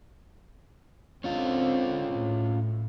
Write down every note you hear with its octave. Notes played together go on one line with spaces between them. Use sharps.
D3 C4 C#4 F4
A2